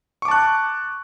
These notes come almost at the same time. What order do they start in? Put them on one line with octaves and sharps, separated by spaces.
C#6 D6 A5 F#6